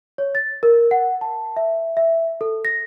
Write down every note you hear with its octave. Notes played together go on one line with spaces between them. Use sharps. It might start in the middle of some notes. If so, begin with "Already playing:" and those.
C#5
A6
A#4
F#5
A5
E5
E5
A4
A#6